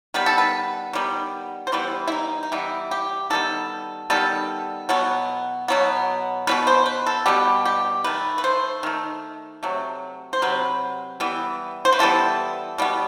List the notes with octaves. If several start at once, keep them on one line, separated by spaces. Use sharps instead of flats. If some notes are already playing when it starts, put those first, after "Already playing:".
D#3 G3 B3 B4
A4
B4
D#3 G3 B3
C5
E3 G3 B3 B4
E4
D#4
D#4
E3 G3 B3 E4
G4
D#3 G3 B3 A4
D#3 G3 B3 A4
B2 F#3 B3
B2 F#3 B3
B2 G3 B3 B4
C5
B4
A4
B2 G3 B3 G4
G4
D#3 A3 B4
B4
C5
D#3 A3
C3 F#3 A3
C5
C3 F#3 B4
E3 G3 B3
C5
B4
E3 G3 B3 A4
B2 G3 B3